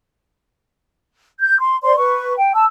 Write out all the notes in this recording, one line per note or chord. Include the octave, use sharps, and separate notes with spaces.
G6
C6
C5 D5 C6
B4 C#6
G5
A5 E6